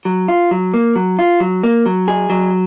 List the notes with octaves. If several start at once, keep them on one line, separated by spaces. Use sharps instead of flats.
F#3
F4
F#3
A#3
F#3
F4
F#3
A#3
F#3
G#4
F#3